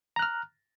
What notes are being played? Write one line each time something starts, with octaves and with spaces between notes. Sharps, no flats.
A#5 F6 F#6